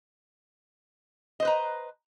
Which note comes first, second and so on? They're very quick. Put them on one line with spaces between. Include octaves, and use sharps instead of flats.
D#5 C5 B4 A#5